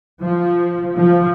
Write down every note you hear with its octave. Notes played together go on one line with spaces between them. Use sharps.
F3
F3